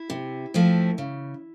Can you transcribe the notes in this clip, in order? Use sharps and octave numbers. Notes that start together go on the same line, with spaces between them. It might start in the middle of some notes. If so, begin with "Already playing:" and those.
Already playing: E4
C3
F3 A3 C4
C#3